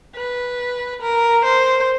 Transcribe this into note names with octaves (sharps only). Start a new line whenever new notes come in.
B4
A#4
C5